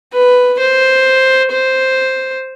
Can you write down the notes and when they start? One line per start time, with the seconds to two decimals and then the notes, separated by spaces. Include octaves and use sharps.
0.13 B4
0.59 C5
1.51 C5